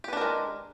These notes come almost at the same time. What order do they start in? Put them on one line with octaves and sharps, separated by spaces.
G4 B4 D4 A#4 G#3